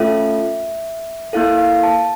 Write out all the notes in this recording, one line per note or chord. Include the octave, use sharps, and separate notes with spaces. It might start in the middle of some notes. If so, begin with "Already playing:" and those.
Already playing: A3 C#4 F4 A4 E5
A#3 E4 A4 F5
F5
A5